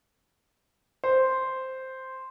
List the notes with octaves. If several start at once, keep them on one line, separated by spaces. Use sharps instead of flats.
C5